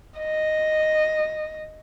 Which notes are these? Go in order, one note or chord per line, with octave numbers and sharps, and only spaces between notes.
D#5